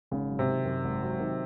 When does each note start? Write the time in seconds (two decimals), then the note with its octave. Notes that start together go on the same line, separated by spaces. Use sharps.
0.11 G#1 C#3
0.30 F#3
0.39 C3
0.48 D#3
0.65 F#2
0.84 G#1
1.02 F#3
1.20 D#3